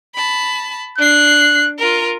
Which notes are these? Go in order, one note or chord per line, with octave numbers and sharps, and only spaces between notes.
A5 B5
D4 F#6 C7
F4 A#4